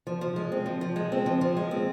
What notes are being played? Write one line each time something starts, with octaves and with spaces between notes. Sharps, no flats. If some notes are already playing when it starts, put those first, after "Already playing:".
F3
F3
G#3
C4
F3
F3
G#3
C4
F3
F3
G#3
C4